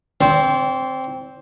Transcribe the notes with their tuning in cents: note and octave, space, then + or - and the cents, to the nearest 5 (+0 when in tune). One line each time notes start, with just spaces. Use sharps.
C4 +0 D5 -45